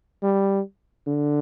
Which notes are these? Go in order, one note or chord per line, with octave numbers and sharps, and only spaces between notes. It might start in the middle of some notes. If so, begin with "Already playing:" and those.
G3
D3